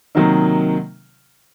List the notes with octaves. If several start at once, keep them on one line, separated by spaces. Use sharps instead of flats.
C3 D#3 F#3 A#3 D#4